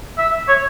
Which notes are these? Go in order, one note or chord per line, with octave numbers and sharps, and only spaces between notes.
E5
C#5